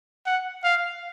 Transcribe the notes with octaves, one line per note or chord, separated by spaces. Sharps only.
F#5
F5